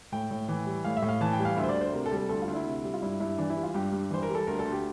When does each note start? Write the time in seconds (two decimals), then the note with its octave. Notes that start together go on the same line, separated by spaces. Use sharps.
0.12 A2 G5
0.31 A2
0.48 E3
0.66 G3
0.84 A2 F5
0.97 E5
1.02 A2
1.09 F5
1.21 E3 A5
1.33 G5
1.39 G3
1.45 F5
1.56 D2 E5
1.64 C5
1.69 D5
1.75 D2
1.81 C5
1.93 C3 A#4
2.06 A4
2.12 G3
2.17 A4
2.29 D2 A4
2.42 F4
2.47 D2
2.54 E4
2.66 C3
2.84 G3
2.93 F4
3.02 G2 E4
3.20 G2 E4
3.38 E3 D4
3.50 E4
3.57 G3
3.63 F4
3.74 G2 G4
3.92 G2
4.11 E3 C5
4.23 A#4
4.30 G3
4.35 A4
4.47 D2 A#4
4.59 A4
4.65 D2
4.72 G4